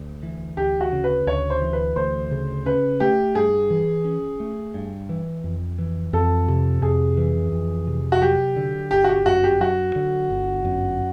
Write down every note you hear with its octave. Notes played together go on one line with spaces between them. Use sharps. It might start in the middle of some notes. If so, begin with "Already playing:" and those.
Already playing: D2
E3
D2 G4
F#4
C#3
B4
D2 C#5
C5
E3
B4
D2 C5
C#3
C#4 B4
A3 G4
G2 G#4
E3
C#4
A3
G2
E3
F2
E3
F2 A4
C3
F2 G#4
E3
F2
C3
F#4
F#3 G4
D3
G1 G4
F#4
G4
F#2 F#4
G4
F#3 F#4
D3
G1
F#2